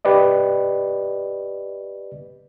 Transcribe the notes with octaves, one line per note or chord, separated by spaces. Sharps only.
G4 B4 D5 D#5